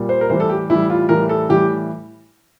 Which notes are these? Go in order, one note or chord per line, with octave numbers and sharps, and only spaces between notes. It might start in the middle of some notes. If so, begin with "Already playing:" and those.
Already playing: A#2 G3
C5
A#4
A2 E3 G3 C5
A4
G4
A2 E3 G3 E4
F4
A2 E3 G3 A#4
A4
A2 E3 G3 G4